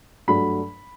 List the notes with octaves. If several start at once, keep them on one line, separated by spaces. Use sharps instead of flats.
G2 F#3 A3 D4 B5